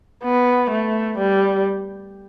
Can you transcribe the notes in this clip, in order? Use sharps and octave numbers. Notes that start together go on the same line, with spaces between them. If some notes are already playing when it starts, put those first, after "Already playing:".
B3
A3
G3